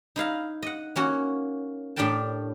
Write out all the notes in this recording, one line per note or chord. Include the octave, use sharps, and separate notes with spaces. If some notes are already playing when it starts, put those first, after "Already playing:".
D#4 E4 F5 A#5
D#5 F#5
A#3 C#4 F#4 C#5
A2 D4 G4 A#4 G5 A5